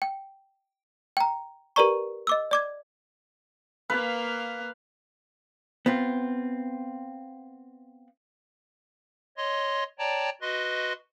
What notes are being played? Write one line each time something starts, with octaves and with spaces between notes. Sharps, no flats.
G5
G5 A#5
G4 A#4 B4 D5 A#5 C#6
D#5 D6 E6
D5 D6 G#6
A#3 B4 F5
B3 C4 F4
C#5 D#5 C6
C#5 D5 G5 A5 A#5
F#4 B4 D#5 C6